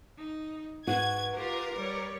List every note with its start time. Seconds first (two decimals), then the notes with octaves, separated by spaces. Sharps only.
0.18 D#4
0.87 G#2 F#4 B4 G#6
1.35 F4 G4 A#4
1.74 G3 C#5